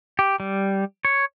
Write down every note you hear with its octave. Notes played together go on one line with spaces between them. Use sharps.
G4
G3
C#5